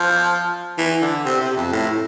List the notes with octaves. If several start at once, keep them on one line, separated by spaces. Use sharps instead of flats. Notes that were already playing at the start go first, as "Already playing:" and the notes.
Already playing: F3
E3
D3
C3
C3
F2
A2